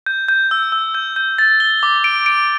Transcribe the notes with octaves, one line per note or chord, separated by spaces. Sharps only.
G6
G6
E6
E6
G6
G6
A6
G7
D6
D7
D7